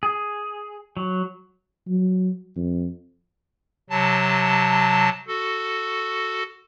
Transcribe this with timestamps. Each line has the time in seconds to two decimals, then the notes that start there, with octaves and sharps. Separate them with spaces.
0.03 G#4
0.97 F#3
1.88 F#3
2.56 F2
3.90 C3 F#3 A5
5.27 F#4 A4